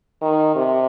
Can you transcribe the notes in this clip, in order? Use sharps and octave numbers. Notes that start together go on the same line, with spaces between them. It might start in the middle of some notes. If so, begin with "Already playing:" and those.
D#3
C3